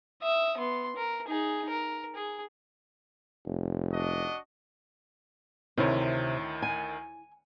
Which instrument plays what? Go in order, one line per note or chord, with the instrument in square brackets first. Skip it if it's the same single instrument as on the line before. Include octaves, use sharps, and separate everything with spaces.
[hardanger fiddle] E5 D#6
B3 C6
A#4
D#4 G#4
A#4
G#4
[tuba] F1
[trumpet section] D4 F#4 D#5
[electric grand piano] D2 D#3 [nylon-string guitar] C3 [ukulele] E4 C#5
[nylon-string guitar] G#5